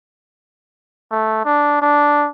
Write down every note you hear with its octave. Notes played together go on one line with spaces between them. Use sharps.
A3
D4
D4